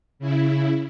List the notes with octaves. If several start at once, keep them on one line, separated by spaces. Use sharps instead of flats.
C#3 E4